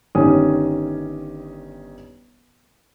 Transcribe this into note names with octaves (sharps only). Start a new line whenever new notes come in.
G1 D#3 C#4 G4 G#5 D#6